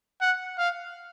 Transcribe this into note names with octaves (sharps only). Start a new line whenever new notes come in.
F#5
F5